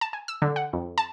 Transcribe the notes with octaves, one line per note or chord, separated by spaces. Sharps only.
A5
G#5
E6
D3
F#5
F2
A5